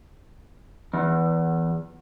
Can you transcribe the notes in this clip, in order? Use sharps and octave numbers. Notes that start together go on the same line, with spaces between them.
E2